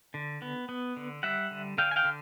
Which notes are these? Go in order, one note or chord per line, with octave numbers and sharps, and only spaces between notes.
D3
B3
B3
D3
G3 E5 F#5
D3
D3 F5 G5
G#5
F5 G5
D3